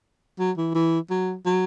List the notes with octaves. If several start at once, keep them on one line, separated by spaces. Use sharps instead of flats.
F#3
E3
E3
F#3
F#3